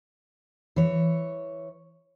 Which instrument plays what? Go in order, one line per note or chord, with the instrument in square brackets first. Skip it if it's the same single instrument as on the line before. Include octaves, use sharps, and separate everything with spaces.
[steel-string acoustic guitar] E3 C#5